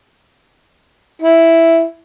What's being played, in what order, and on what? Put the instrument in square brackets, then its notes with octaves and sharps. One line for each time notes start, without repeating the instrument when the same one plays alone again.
[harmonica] E4